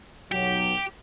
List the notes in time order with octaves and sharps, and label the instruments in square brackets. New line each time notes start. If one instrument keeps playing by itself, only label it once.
[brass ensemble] B1 F#3 [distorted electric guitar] G4